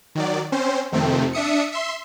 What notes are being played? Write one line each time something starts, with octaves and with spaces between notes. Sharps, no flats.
D#3 F#3 D5
C4 C#4 C5
F2 C3 D#3 A3 C4
D4 E5 D#6 C#7
E5 C6